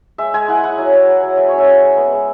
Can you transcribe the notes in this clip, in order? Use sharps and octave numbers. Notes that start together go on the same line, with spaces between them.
G#3 E5
G#3 G#5
E4 F#5
E4 F#5
F#3
F#3
F#3
F#3
G#3 E5
C#4 C#5
E5
G#3
G#3
B3
G#3